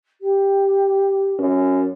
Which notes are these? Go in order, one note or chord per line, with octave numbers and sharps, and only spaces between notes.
G4
F#2